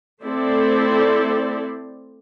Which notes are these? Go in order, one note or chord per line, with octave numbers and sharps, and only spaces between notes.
A3 C4 E4 A4 C5 D5